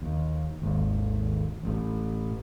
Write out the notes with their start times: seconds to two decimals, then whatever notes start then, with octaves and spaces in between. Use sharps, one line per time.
0.02 D#2
0.62 G#1 D#2
1.63 A1 A2